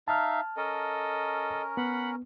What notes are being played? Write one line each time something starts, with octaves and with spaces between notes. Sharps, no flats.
D#4 E5 F5 A5 F6
C#4 A4 A#4 D#5
B3 F#5 B5